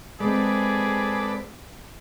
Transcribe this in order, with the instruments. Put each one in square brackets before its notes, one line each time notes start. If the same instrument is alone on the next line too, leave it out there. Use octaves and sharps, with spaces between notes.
[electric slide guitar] G#3 C4 [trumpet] G#4 [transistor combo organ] A4 B4 D5